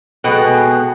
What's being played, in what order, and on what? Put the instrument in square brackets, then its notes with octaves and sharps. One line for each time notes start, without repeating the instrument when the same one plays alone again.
[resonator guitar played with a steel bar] B2 [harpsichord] G#3 B3 [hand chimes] A4 F#5 G5